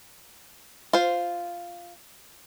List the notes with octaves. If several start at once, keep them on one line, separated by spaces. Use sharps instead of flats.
F4 C5